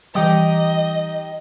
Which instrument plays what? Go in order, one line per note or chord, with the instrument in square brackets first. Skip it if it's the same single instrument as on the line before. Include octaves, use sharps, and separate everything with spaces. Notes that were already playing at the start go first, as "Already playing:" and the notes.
[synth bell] E3 G3 [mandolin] D#4 G4 D#6 [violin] D#5